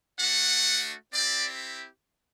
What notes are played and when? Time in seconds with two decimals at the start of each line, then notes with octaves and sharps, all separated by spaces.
0.19 A3 D4 F#4 F#5
1.13 C4 E4 G4 D5